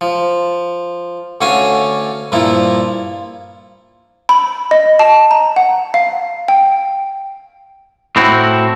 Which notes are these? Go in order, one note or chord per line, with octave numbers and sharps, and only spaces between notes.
F3
D2 D3 C#4 F#4 F5 G#5
G2 A#2 F3 A#3 E4
B5
D#5
A5
A#5
F#5
F5
G5
A2 C4 E4 F#4